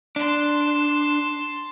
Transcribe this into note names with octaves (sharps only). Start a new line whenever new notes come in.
D4 A5 C6